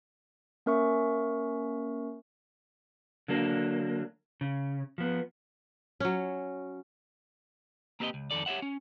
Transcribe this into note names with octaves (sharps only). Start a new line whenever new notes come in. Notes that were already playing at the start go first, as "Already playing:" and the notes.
A#3 C#4 A#4 E5 C#6
D3 F#3 A#3 D4
C#3
F3 B3
F#3 C#4
A#3 C4 G4 B4 C#5 D#5
C#2
F2 D#3 A4 D5
G4 C#5 E5 F#5
C#4